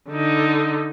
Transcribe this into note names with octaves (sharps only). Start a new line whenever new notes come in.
D3 D#4